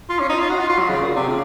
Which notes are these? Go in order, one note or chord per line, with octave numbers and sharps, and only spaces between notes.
F4
C#4
D#4
F4
F#4
F4
F4
F#3
C#3
A#2
C3
C#3